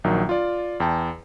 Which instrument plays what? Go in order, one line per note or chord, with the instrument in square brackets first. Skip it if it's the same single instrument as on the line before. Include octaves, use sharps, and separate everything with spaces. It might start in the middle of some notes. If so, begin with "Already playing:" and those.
[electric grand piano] A#1 D#3 F#3
F4 D5
E2 G5 A5